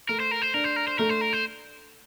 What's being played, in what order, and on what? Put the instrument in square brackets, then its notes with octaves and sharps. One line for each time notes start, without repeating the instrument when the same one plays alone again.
[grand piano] A3 [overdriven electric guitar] A#4
[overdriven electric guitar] C5
A#4
C5
[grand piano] D4 [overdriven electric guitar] A#4
[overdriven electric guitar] C5
A#4
C5
[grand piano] A3 [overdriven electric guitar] A#4
[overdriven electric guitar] C5
A#4
C5